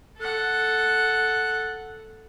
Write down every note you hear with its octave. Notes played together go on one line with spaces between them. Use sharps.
A4 F#5